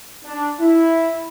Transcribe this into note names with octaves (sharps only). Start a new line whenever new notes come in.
D4
E4